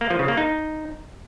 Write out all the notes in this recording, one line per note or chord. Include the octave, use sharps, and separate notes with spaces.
A#3
F3
C#3
A#3
D#4